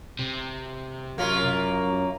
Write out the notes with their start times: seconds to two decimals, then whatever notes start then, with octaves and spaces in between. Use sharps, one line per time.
0.19 C3
1.18 F#2 A#3 C#4 F4